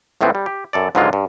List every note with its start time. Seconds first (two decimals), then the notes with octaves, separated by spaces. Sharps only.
0.21 C#2 A2 E3 B3 C4
0.35 G3
0.46 G4
0.73 F#2 A4 D5
0.95 C#2 G#2 D3 F#3 G#3 F4
1.13 G2